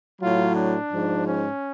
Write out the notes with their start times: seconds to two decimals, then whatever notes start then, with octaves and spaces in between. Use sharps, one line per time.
0.21 A2 F#3 F4
0.56 D4
0.91 G#2 F3
1.26 C#4